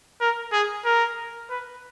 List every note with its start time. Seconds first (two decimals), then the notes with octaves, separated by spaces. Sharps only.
0.21 A#4
0.52 G#4
0.85 A#4
1.49 B4